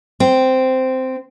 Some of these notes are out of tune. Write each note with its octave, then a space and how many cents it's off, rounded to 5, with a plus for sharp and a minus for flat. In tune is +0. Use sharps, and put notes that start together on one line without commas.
C4 -10